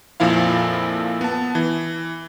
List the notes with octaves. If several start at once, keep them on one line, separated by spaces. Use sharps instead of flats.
F2 A#2 F3 E4 F5
B3 A5
E3